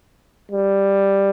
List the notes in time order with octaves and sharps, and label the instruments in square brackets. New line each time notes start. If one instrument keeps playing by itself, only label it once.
[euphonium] G3